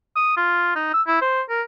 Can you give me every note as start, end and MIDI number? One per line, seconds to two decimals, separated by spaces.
0.16 0.36 87
0.37 0.75 65
0.76 0.92 63
0.94 1.02 88
1.07 1.20 64
1.22 1.42 72
1.50 1.62 70